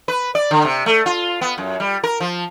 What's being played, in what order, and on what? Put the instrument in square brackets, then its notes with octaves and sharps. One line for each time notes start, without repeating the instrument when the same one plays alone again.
[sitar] B4
D5
D3
C3
A3
F4
B3
F#2
G3
A#4
F3